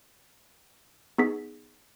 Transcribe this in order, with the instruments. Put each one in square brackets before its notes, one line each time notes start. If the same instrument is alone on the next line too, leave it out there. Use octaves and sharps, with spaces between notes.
[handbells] B3 D#4 G#4 B6